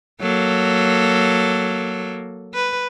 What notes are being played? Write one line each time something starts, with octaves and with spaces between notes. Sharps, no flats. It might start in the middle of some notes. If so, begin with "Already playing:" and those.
F#3 A#3 A4
B4